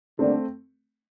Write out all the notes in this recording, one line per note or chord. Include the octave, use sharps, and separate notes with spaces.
D3 G3 A3 A#3 C4 D4